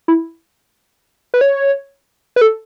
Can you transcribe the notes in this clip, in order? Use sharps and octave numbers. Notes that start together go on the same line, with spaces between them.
E4
B4
C#5
B4
A4